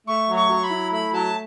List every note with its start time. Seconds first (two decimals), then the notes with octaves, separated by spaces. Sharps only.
0.07 A3 C#6
0.29 F#3
0.36 C#6
0.49 F#3
0.64 B5
0.71 E4
0.92 A3 B5
1.13 F#3 A5